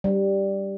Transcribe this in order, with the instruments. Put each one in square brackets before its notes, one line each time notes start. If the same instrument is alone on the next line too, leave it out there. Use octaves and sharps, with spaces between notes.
[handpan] G3